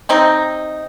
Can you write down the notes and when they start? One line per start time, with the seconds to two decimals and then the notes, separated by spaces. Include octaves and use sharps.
0.09 C3 C4 D#4